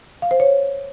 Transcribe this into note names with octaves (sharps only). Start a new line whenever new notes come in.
F5
C5
C#5